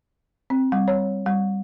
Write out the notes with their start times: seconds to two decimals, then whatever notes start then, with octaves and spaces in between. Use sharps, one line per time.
0.50 C4
0.72 G3
0.88 C#5
1.26 G3